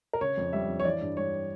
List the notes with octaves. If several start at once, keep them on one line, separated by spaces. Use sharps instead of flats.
A#4
C#3 C#5
F2
G3 E5
F2
C#5
E3 D5
G2
G3 C#5